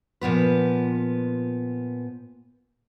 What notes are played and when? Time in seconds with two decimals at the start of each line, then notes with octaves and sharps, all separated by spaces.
0.21 A#2 F3 B3 B4